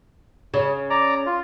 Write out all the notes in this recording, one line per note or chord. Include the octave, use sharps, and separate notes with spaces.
C#3
D5 A#5
F4